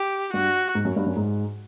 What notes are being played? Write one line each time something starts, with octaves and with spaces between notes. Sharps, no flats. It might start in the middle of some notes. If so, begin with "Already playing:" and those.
Already playing: G4
G2 F#4
G#2
F#2
G2
F#2
G#2